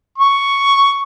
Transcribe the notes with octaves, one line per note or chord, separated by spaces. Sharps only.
C#6